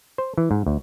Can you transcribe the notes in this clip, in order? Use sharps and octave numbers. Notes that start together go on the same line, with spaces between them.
C5
E3
G#2
D2